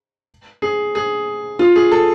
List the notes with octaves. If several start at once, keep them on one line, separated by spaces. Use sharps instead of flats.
G#4
G#4
F4
G#4
A4